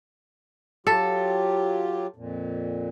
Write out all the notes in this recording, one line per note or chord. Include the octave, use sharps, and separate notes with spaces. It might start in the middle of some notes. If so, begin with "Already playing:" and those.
F#3 F4 G4 A4
F2 A#2